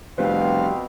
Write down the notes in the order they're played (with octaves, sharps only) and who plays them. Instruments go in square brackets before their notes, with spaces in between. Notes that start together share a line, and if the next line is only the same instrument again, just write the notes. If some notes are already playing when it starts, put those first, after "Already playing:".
[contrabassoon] F1 [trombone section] B2 C4 [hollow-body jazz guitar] G3 B4 C5 [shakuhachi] F5